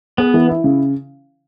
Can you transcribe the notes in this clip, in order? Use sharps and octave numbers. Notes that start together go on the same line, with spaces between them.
B3 G#4
E3
E4
C#3